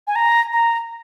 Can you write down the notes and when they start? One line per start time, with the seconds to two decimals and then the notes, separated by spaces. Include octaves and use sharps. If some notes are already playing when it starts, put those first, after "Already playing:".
0.07 G#5
0.16 A#5
0.53 A#5